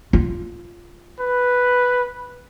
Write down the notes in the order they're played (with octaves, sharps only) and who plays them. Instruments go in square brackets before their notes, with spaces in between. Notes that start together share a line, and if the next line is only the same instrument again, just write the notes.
[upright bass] F4
[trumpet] B4